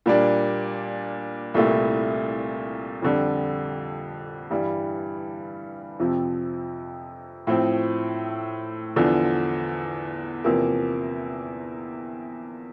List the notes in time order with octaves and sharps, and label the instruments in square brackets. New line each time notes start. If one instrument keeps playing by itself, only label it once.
[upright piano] A#2 G3 A#3 D4
C2 A#2 A3 E4
F2 D3 G3
G2 E3 G3
F2 C3 F3
A2 F3 C4
E2 D3 F3
E2 C3 F3 A#3